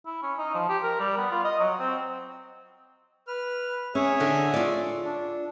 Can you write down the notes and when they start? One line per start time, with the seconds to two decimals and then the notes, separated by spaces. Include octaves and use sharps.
0.06 E4
0.23 C#4
0.38 D#4
0.55 F3
0.69 G4
0.83 A#4
1.00 G3
1.18 B3
1.32 F4
1.45 D#5
1.60 F#3
1.80 C4
3.28 B4 F6
3.95 C#4 G#4 C#5 E5
4.20 D3 D4 A4
4.54 F4 D5
5.05 D4